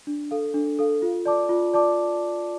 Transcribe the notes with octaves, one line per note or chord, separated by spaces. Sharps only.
D4
A4 F5
D4
A4 F5
F4
D5 A5 D6
F4
D5 A5 D6